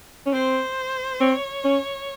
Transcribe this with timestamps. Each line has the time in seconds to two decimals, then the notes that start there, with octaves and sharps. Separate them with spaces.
0.26 C#4
0.33 C4 C5
1.20 C4 C#5
1.65 C#4